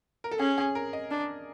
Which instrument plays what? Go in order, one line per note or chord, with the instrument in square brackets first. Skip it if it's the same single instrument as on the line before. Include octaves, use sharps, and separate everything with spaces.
[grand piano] A#4
A4
[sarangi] C#4 [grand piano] G#4
[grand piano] G#4
A#4
D#5
[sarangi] D4